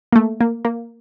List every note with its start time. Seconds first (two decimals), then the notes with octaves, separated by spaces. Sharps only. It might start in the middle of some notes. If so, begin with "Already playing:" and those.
0.12 A#3
0.16 A3
0.41 A#3
0.65 A#3